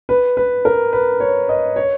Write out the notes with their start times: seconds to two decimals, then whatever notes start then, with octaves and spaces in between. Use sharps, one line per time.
0.09 B4
0.37 B4
0.65 A#4
0.93 B4
1.20 C#5
1.49 D#5
1.76 C#5